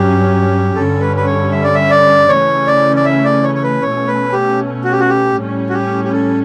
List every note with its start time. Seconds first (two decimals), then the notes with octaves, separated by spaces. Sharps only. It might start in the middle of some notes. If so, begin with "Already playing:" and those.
Already playing: G2 F#3 C#4 G4
0.75 G2 D3 G3 C#4 A4
1.01 B4
1.16 B4
1.26 C#5
1.52 E5
1.64 D5
1.75 E5
1.91 D5
2.28 C#3 E3 A3 C#4 C#5
2.67 D5
2.96 D5
3.05 E5
3.24 D5
3.44 C#5
3.55 C#5
3.63 B4
3.82 B2 A3 C#4 C#5
4.07 B4
4.33 G4
4.84 F#4
4.92 G4
5.00 F#4
5.09 G4
5.35 A2 G3 C#4
5.69 F#4
5.73 G4
6.04 G4
6.12 A4